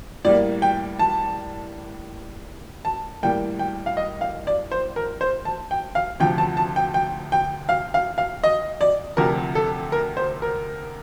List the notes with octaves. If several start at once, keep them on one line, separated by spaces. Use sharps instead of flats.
A2 G3 A#3 D5
G5
A5
A5
A2 G3 A#3 G5
G5
F5
D#5
F5
D5
C5
A#4
C5
A5
G5
F5
D2 C3 F3 G5
A5
A5
G5
G5
G5
F5
F5
F5
D#5
D5
D2 C3 F3 A#4
A4
A#4
C5
A#4